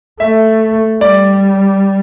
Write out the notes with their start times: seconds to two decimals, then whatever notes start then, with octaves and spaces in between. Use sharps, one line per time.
0.20 A3 E5
1.01 G3 D5